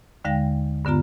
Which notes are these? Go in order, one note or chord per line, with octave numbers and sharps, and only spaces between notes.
D#2 D3 G#3 F5 G5 A#6
G2 D3 B3 F4 A#5